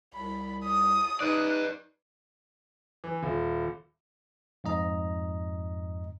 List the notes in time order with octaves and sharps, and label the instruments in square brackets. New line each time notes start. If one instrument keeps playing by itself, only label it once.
[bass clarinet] C2 [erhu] B5
[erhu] D#6
[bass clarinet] D#4 [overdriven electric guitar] B4 D5 [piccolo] F#6
[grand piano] E3
D#1
[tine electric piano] F2 G#2 D#5 A#5